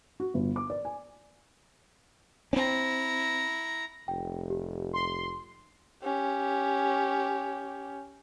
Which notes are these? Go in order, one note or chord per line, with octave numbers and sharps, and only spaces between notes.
F#4
G1
D6
D5
G#5
C4 C#4 E4 A#5
F1 G5
G4
C6
C#4 G4